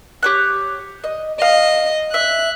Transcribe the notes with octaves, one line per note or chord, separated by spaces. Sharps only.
G4 C#5 F#6
D#5
D#5 F5
E5 F#6